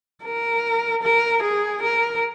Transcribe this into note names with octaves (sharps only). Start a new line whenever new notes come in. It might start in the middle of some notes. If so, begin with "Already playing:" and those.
A#4
A#4
G#4
A#4